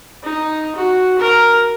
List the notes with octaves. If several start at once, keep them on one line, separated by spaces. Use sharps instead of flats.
D#4
F#4
A#4